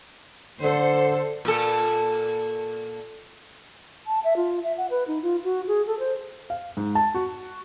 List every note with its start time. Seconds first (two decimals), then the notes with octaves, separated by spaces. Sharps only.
0.62 D3 A4 C5
1.45 A#2 A4
4.07 A5
4.24 E5
4.36 F4
4.63 E5
4.77 F#5
4.90 B4
5.08 D#4
5.22 F4
5.44 F#4
5.68 G#4
5.87 A4
5.99 C5
6.50 F5
6.77 G#2
6.95 A5
7.14 F#4